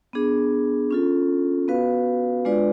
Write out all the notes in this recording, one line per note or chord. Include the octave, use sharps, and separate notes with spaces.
B3 D4 G#4
C#4 F4 A4
B3 F#4 B4 F5
G#3 D4 F4 B4 D5